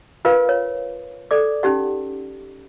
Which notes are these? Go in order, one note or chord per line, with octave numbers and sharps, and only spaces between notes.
F4 A#4 B4 F5
C#5
A4 D5 D6
C#4 D#4 G4 F#5